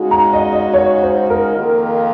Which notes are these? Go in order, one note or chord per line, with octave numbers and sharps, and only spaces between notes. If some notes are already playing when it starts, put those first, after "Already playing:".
Already playing: C#3 G#3 D#4 F#4
A#5
D#5
D#5
C#5
C5
A#4
F2 D#3 A#3 F4